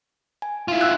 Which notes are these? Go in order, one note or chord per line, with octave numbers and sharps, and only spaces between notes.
G#5
E4 F4
E6 F#6